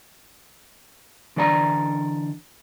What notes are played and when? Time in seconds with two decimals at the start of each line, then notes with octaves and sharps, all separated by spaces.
1.36 D3 E3 D4 D5 F5 A#5